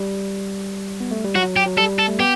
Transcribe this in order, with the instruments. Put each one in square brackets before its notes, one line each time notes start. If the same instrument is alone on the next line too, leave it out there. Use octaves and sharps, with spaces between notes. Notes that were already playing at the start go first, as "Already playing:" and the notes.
Already playing: [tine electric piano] G3
B3
A3
G3
[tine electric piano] F#3 [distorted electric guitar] F#4
[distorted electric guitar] G4
[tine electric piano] F#3
[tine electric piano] G3 [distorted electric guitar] A4
[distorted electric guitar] A4
[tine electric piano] A3
[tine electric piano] B3 [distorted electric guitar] G4